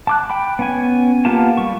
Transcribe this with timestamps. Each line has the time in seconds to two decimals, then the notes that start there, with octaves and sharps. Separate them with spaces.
0.07 A5 D6 F#6
0.29 G5 B5
0.59 B3 C#4 G#5
1.25 A#3 B3 F4 G4 A5
1.57 G3 C#6